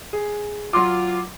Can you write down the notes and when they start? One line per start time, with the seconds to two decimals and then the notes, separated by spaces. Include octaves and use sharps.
0.13 G#4
0.73 F#3 F4 C6 D6